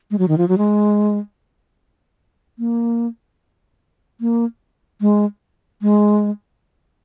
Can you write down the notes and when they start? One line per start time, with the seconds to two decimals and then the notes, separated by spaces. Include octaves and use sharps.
0.11 G#3
0.18 F#3
0.28 D#3
0.38 F3
0.48 F#3
0.58 G#3
2.59 A#3
4.21 A#3
5.01 G#3
5.82 G#3